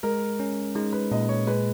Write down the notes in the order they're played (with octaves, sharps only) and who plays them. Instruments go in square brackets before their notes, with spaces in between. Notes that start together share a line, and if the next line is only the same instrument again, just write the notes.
[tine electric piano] G#3 [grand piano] A#4
[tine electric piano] C#4
[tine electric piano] G#3 [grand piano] D#4
[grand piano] B4
[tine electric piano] A#2 [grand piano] D#5
[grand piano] C#5
[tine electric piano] G#3 [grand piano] B4